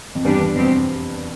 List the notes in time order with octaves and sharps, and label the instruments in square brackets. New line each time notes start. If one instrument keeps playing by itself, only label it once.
[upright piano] F2
[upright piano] E2 G2 [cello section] G3 D4 G4
[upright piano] E2
[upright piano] F2 [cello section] B2 G3 C4 G4